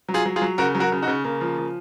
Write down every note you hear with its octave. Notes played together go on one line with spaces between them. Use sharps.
F#3
F4 G#4
F#3
F4 G#4
F#3
C#3 F#4 A#4
F#3
F#4 A#4
C#3
D#4 F#4
C#3
C#3 A#3
F3
F3